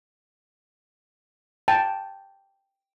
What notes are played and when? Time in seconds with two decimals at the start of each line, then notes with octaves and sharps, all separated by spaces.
1.68 G5 A5